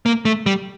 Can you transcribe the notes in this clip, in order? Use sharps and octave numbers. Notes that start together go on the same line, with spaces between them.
A#3
A3
G3